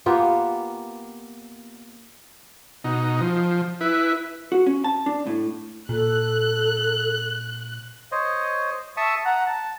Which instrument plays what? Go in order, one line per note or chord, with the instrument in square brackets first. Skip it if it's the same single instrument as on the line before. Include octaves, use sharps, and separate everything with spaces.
[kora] A#3 B3 F4 G4
[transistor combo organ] B2 D#4
F3
E4 B4
[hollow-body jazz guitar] F#4
C#4
A5
D4
A2
[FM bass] A#2 [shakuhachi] A4 [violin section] F#6
[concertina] C5 C#5 D#5
E5 A5 C#6 D#6 E6
F#5 A#5
A5